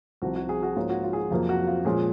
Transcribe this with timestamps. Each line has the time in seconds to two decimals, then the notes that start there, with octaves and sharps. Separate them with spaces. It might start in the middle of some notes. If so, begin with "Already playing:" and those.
0.22 C2 C3 F3 F#4
0.36 F#4
0.49 G#4
0.63 F#4
0.76 G#2 F3 A#3 C#4 F4
0.90 F#4
1.04 F4
1.13 G#4
1.17 F#4
1.31 F2 C3 F#3 A#3 F4
1.49 F#4
1.67 F4
1.85 A#2 F3 G#3 C#4 G#4